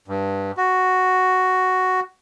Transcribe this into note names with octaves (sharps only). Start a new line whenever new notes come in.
G2
F#4